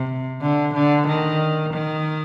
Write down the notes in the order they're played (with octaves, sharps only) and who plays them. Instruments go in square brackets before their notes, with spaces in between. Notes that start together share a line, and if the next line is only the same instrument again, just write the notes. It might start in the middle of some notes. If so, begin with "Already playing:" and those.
Already playing: [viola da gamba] C3
D3
D3
D#3
D#3